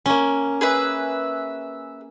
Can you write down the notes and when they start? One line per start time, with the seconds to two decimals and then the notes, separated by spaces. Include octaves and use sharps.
0.06 A#3 C#4
0.61 G#4 B4 E5